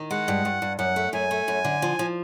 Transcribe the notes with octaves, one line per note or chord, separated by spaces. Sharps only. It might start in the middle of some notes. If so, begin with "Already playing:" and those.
Already playing: D#3
G#3 F#5
G2
G2
G2
F#2 F#5
A3
F#2 G#5
A3
F#2
D3
F3
F3